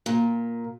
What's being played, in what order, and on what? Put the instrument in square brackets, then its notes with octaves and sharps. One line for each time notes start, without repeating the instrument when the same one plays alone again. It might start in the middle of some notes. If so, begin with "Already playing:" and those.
[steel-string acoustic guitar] A#2